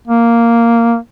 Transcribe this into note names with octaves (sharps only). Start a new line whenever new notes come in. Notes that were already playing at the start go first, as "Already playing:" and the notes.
A#3